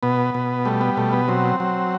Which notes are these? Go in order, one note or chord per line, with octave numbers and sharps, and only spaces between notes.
B2 B3
B2
G3 A3
B3
B2 A3
B3
F#3 C4
F#3